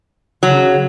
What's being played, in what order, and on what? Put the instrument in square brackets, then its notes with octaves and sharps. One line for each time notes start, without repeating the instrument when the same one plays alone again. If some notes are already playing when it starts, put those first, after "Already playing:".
[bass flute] C#3 [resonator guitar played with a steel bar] F#3